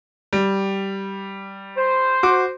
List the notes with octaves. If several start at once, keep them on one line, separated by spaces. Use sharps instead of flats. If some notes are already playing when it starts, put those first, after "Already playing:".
G3
C5
F#4 D6